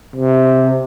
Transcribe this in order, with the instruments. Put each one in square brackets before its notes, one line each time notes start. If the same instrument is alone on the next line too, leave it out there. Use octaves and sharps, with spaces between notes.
[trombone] C3